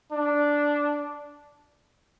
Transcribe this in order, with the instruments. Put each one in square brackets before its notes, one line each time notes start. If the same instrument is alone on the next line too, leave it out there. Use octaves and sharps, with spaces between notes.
[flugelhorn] D4